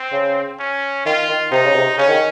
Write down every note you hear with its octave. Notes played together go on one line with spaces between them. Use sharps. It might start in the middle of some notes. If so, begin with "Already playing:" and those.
Already playing: C4
C#3
C#4
D#3 F4
D#3
C3 D#4
C#3
C3
C#3 C#4
D#3